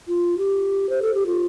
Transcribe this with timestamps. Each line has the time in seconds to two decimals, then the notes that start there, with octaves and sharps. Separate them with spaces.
0.08 F4
0.38 G4
0.89 C5
1.02 A4
1.14 G4
1.26 F4